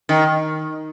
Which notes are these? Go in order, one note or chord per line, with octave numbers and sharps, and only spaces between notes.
D#3